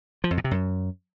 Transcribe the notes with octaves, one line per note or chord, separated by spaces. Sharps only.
F3
F2
A#2
C3
F#2